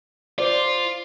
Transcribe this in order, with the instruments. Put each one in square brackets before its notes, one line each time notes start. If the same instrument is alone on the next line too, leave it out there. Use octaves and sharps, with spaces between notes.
[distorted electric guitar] F4 [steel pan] C5 D5